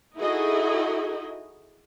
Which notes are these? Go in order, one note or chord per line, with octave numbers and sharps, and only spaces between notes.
D#4 E4 F#4 G#4 A4 D#5